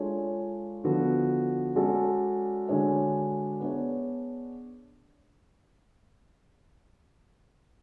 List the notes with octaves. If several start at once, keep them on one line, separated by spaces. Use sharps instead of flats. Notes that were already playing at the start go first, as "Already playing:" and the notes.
Already playing: G#3 D4 F4 A4 C#5
D3 F3 B3 F#4
G#3 C#4 F#4 A4 D5
D3 G#3 D4 F#4 C#5
B3 D4 G#4 C#5